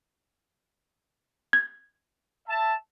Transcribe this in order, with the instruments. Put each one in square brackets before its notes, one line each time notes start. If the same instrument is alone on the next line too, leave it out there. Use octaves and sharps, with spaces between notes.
[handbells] G#6
[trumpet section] E5 A5